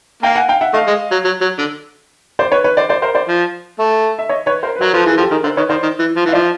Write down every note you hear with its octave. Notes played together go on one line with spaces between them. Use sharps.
A#3 F5 G5
F#5 G#5
F5 G5
E5 F#5
A3 D#5 F5
G#3
F#3
F#3
F#3
D3
C5 D5
B4 C#5
B4 C#5
C5 D5
C5 D5
A#4 C5
C5 D5
F3
A3
E5
C#5 D#5
B4 C#5
A#4 C5
B4
F#3 A#4 C5
F3 A4 B4
E3 G#4 A#4
F3 G4 A4
D#3 G#4 A#4
D3 A#4 C5
D#3 B4 C#5
D#3 C5 D5
D#3
E3
F3
E3 F5
F3 D5 E5